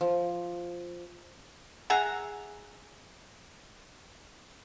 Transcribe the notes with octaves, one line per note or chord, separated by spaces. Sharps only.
F3
G#4 E5 F#5 A#5